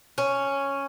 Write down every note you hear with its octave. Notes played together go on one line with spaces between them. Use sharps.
C#4